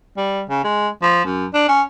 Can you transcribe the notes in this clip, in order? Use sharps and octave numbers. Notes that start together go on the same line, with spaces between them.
G3
C#3
G#3
F3
F#2
D4
C#4